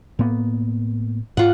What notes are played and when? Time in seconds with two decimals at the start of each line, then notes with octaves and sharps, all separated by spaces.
0.19 A2 A#3 B3
1.37 G#2 F4 F#5